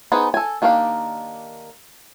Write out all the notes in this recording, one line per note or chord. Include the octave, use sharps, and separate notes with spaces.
B3 D#4 G#4 B4 C5
A4 G#5
D#3 A#3 D4 G4 F5